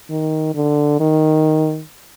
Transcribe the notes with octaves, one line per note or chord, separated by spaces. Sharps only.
D#3
D3
D#3